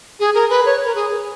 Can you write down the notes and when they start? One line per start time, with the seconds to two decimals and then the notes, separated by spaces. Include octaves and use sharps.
0.20 G#4
0.35 A#4
0.50 B4
0.65 C#5
0.85 A#4
0.95 G#4